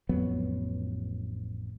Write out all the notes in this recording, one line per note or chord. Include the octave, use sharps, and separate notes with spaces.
A1 F2 F#3 B3